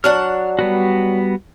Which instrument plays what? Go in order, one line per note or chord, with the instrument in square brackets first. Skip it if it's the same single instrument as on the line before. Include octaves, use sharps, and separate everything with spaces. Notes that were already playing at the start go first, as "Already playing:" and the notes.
[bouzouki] F#3 D4 F#5 [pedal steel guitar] F6
[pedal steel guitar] G3 B3 F#4